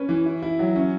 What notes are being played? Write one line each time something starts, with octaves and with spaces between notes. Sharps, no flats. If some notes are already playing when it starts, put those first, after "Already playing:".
Already playing: C#4 B4
E3
E4
E4
F#3
C#4